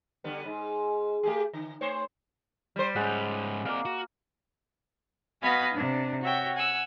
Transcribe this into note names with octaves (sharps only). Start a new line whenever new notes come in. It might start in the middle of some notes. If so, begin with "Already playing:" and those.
D3 G3 B3
G#2
A3 G4 G#4
D3
A3 C5 C#5
G3 C5
G#2 G#3 C#4 F#5
A#3 C4 D5 F5
F#4
B3 F#4 D#5 F5 G#5 B5
C3 D4
F#4 C#5 E5 G5
F#5 G#5 E6